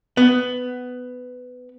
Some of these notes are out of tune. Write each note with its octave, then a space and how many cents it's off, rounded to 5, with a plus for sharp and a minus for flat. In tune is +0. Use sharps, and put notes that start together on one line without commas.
B3 +15